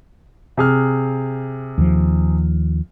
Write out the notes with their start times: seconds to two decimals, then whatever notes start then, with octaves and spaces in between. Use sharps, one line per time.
0.57 C3 G#4 F6
1.78 D#2 F3